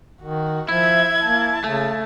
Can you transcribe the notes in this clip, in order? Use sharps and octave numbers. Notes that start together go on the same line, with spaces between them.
D#3 F#4
F3 E4 E5 G#6
A#3 A5
C#3 A3